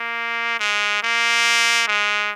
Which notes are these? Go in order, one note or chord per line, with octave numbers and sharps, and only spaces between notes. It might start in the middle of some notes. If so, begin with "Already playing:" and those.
Already playing: A#3
G#3
A#3
G#3